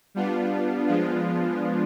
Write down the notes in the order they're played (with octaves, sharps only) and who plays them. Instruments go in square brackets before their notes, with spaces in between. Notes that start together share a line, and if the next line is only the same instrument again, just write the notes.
[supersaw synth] G3 B3 D4 F4
F3 G#3 B3 D4 F4